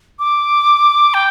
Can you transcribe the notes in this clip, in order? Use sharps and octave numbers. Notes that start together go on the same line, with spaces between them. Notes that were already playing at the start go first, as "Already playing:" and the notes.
D6
G5